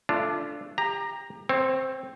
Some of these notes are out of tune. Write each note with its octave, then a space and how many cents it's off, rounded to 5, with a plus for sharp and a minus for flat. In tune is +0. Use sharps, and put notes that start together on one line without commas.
A3 +0 D4 +0 F4 -20
G4 +30 A#5 +0
C4 +0 C#5 -30